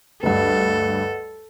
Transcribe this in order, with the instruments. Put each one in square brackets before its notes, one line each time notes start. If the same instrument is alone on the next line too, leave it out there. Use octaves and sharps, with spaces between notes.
[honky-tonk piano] D2 G2 [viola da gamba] A4 [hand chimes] B4 D#5 F#5